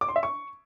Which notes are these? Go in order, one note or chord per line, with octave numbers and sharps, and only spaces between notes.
D6
C6
E5
C#6